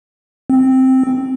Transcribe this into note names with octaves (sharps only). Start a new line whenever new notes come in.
C4